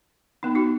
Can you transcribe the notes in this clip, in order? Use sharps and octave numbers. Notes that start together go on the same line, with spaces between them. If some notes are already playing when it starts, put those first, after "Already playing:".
B3 D#4
D#4 F#4